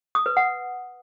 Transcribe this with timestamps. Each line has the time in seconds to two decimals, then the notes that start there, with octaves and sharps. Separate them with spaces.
0.15 D#6
0.26 B4
0.37 F#5